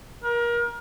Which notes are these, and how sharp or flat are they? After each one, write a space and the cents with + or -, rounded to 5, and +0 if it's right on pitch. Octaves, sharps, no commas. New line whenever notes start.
A#4 +30